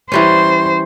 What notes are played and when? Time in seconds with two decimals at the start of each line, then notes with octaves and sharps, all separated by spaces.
0.12 E3 G3 C#4 C5